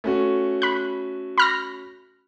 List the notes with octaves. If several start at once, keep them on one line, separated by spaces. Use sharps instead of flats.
A3 C#4 F#4
B5 F#6
B5 F6 A#6